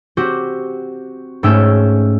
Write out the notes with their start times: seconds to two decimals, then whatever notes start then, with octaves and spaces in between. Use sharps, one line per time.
0.17 C4 F#4 G4
1.43 G#2 A3 C#4 G5 E6